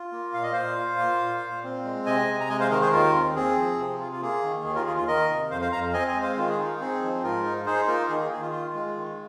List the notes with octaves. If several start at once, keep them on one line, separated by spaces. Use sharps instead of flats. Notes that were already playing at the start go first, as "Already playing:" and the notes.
Already playing: F4
A#3
A#2 F5
D#5
A#2 C5 F5
F4
A#3
A#2
A#2
C4
G#3
C3 D#5 G#5
C3
A#5
G#3 D#5 G#5
C5 F5
D#3 A#4 D#5
G#4 C5
D#2 F4 A#4
C4
C4 G#4
F3
C3
F4
F4
A#3 G#4
D#3
D#2 G#4
F4 A#4
F4 G#4
F4
D#3 A#4 D#5
C3
F2 C5 F5
C5 F5
F2 F5 A#5
C4 D#5 G#5
D#5 G#5
G#3
C5 F5
D#3 F4
G#4
D#4 F4
C4 G#4
F3
G#2 F4 A#4
D#4
D#4 G#4 C5
A#3 F4 A#4
D#3 G#4
G#4
D#3 G#4
F4
F4
G#3
D#3